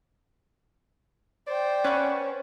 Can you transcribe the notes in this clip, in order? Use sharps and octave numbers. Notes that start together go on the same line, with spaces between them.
C5 D5 G5
C#4 B4 C#5 F#5